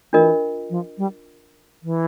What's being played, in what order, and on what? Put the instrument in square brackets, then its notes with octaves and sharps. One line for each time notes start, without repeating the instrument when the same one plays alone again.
[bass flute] E3 [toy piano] D4 F4 A#4 D#5
[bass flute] F3
G3
E3